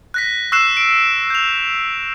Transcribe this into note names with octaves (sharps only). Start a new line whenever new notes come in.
F#6 A#6 B6
C#6 E6 F#6 C7 E7
D7
G6 F7